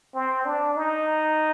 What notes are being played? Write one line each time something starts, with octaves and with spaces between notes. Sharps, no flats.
C4
D4
D#4